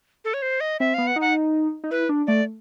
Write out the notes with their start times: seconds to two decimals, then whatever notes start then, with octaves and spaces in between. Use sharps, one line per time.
0.25 A4
0.34 C#5
0.42 C5
0.60 D#5
0.80 C4 E5
0.94 B3 F5
1.07 F#5
1.16 D#4
1.21 F#5
1.84 D#4
1.91 E4 B4
2.09 D4
2.27 A3 D5